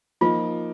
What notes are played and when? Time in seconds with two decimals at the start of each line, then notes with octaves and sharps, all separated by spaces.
0.21 F3 A#3 D#4 F4